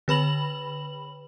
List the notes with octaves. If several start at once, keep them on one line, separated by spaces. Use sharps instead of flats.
D3 B4 B5 F#7